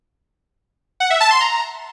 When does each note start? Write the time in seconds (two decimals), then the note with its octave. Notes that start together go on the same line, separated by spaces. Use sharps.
1.00 F#5
1.10 E5
1.20 A5
1.31 C6
1.41 A#5